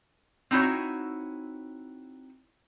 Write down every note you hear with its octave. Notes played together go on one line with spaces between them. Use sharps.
C4 D#4 E4 F#4 C#5